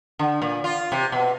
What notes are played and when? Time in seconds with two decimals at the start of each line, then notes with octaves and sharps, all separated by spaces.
0.19 D3
0.42 A#2
0.64 F4
0.92 C3
1.12 B2